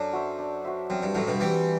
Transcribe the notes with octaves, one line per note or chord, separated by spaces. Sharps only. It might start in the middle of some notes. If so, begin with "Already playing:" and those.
Already playing: F#2 D4 A4
F#4 C5 E5
D4
F#4 C5 E5
F#2 C4
G2
F#2 A2 F#4 C5
G2 B2
E3 G3 C4